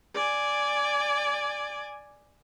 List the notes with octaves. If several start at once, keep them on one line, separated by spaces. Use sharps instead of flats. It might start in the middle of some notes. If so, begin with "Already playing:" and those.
D5 G#5